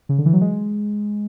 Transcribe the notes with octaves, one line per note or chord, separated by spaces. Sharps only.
C#3
D3
E3
F#3
G#3